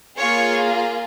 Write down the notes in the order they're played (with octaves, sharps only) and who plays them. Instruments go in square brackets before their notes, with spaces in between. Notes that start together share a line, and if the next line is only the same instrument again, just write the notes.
[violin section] A#3 F4 G#4 C#5